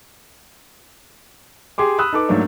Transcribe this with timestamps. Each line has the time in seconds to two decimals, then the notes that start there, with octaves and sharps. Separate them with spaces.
1.78 G4 G#4 C6 D6
1.98 B5 D#6 E6 F#6
2.13 D#4 A4 B4 D6
2.29 G#2 F#3 A3 A#3 D4